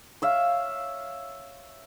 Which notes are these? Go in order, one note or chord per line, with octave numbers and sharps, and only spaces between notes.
C#5 E5 F5